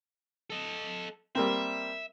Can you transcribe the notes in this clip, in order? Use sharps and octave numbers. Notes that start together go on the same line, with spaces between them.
A4 D#5
G3 A#3 C4 E5